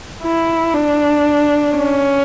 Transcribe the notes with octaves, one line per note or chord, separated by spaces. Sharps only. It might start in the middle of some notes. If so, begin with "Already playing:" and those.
E4
D4
C#4